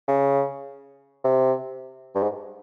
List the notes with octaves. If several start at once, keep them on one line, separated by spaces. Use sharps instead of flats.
C#3
C3
G2
G#2